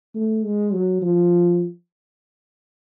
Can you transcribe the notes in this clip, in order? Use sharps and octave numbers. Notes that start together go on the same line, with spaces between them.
A3
G#3
F#3
F3